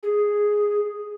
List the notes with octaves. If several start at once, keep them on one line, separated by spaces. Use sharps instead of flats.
G#4